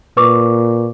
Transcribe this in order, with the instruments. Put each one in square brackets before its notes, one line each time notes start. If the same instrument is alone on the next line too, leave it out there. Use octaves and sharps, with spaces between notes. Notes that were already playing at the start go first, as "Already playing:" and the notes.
[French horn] A#2 [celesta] B4 C#6 D6